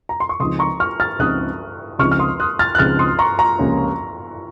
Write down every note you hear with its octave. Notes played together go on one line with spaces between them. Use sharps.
A#5
C6
C#6
C#2 C#3 F3 C4 D#4 C6 D#6
A#5 C#6
C#6 F6
F6 A6
C#2 C#3 F3 C4 D#4 D#6 F#6
C#2 C#3 F3 C4 D#4 C#6 F6
F6
C6 D#6
D#6 F#6
F6 A6
F#6
C#2 C#3 F3 C4 D#4 F6 A6
C6 D#6
A#5 C#6
A#5 C#6
C#2 C3 F3 A#3 C#4